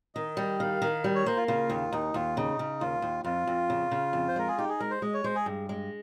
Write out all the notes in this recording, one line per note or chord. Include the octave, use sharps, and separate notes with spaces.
D#3 D#5
G3
D#3 F5
D#3
G3
C#5
A#3 C5
F4
C#3 F4
D#2
D#2 D#4
D#2 F4
C#3 D#4
C#3
D#2 F4
D#2
F2 F4
F2
C#3
C#3
F2
C5
G#3 A#4
G#4
D#4 G4
G#4
G#3 A#4
C5
G#3 D#5
C#5
G#3 C5
G#4
G2
G#3